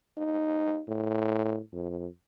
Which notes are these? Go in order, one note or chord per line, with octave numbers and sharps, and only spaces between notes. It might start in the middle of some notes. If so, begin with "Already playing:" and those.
D#4
A2
F2